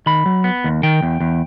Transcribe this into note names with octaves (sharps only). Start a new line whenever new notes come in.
D#3 B5
F#3
B3
D#2
D#3 G5
E2
E2